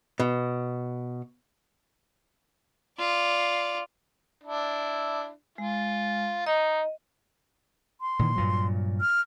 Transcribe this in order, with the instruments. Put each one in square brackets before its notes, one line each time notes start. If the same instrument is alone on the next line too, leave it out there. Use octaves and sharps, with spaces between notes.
[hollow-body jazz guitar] B2
[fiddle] F4 D5
[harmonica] D4 E4
[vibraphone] G#3 [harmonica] F4
[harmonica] D#4 [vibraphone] D#5
[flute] C6
[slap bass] A#2 D#3 E3
G2 A#2 F#3
[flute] F6